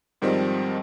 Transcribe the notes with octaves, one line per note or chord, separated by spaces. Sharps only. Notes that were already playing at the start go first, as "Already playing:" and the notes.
G#2 D#3 F3 G3 C4